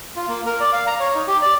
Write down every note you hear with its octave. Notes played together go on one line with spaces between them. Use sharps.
F4
A#3
A#4
D5
F5
A#5
C#5
D#4
G4
D5